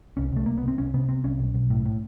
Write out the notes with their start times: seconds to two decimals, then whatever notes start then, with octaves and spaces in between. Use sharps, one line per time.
0.17 C2 C#4
0.32 C2 A3
0.46 C2 A#3
0.58 B3
0.63 C2 C4
0.78 C2 C#4
0.94 C3 B3
1.09 C3 C4
1.24 C2 C#4
1.39 B1
1.54 B1
1.70 A2
1.86 A2